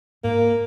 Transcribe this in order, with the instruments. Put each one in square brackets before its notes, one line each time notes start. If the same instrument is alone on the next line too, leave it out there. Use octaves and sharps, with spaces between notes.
[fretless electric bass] G#2 [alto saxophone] A#3